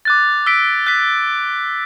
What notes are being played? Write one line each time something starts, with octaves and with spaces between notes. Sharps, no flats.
D6 F#6 A6
E6 B6 D7
F#6 B6